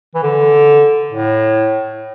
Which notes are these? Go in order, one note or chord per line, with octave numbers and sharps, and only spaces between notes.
E3
D3
A2